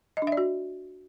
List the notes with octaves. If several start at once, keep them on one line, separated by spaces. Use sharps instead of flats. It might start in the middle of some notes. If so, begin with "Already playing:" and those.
D#5
D4
E5
D5
F#4